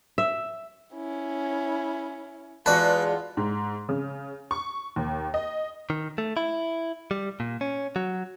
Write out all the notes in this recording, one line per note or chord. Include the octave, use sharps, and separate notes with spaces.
E5
C#4 E4
E2 G#3 F4 F#4 B4 D5 A5
G#2
C#3
C#6
D#2
D#5
D#3
A3
E4
G3
A#2
C#4
F#3